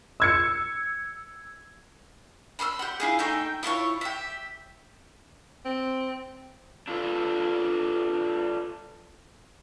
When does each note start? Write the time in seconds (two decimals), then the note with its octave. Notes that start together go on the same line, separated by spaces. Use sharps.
0.20 E6 G#6 C#7
2.59 B5 C6 D#6 E6
2.79 G4 F#5
3.00 E4 F4 G#4
3.19 A3 D#4 E5 G5
3.63 E4 F4 A4 C#5
4.01 G4 E5
5.65 C4
6.87 D4 F4 A4 B4